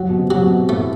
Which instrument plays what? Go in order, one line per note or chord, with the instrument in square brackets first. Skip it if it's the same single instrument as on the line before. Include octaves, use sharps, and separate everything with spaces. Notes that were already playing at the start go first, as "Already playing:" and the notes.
Already playing: [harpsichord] F#3
[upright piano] B2
C3
[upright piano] C3 [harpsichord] F#3
[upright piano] B2
[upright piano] A2 [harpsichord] A3